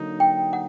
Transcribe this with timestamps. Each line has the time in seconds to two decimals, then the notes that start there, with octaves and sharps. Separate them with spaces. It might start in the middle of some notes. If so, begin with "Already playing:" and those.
Already playing: D3 F#3 A#3 D#4
0.20 G5
0.53 F#5